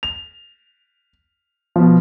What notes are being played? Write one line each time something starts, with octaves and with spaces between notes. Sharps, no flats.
F7
B2 F3